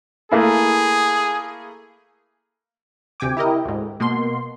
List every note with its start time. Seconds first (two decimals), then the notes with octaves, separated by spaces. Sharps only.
0.32 A3 A#3 E4 G#4
3.20 D2 C3 G5 G#5 D6
3.37 E4 G4 A#4 D#5
3.65 D2 G#2
4.00 B2 A#3 C6